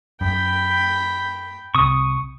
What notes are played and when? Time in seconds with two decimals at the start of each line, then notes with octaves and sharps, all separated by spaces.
0.21 F#2 G5 B5
1.75 C2 C3 C#6 D#6